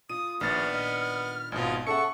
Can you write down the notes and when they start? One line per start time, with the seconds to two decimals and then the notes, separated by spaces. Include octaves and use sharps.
0.10 F4 D#6 D#7
0.41 A#1 A#2 D#3 B3 D4 F6 A6
0.74 D#5
1.52 G#1 B2 F4 D#5 G#5
1.87 C#4 G#4 A4 E5 F#5 C#6 C#7